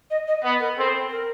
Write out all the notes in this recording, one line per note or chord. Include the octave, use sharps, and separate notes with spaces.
D#5
D#5
B3 B4
A#4
C4 A4
A#4